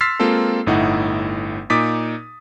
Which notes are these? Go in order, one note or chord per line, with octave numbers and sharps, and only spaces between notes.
C6 E6 F6 A6 B6 C7
G#3 A#3 C4 F4 A4
G1 A2 D#4 E4 F#5
A#2 D#4 D6 D#6 A6 B6